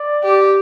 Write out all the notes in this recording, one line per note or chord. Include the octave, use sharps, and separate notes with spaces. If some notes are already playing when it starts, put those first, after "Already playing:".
Already playing: D5
G4